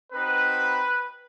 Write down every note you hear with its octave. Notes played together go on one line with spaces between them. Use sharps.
C4 D#4 F#4 B4